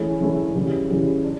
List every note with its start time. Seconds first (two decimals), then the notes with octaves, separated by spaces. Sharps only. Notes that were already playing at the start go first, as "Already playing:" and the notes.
Already playing: E3 A3 C#4 E4 G#4
0.21 E3 A3 C#4 E4 G#4
0.55 C#3 E3 G3
0.90 C#3 E3 G3
1.24 D4